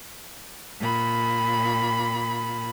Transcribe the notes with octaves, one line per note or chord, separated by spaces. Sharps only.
A#2 B5